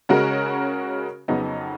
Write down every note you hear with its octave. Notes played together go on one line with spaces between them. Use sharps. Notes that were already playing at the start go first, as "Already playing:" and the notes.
C#3 G#3 C#4 F#4 A#4
F2 C#3 F#3 B3 D#4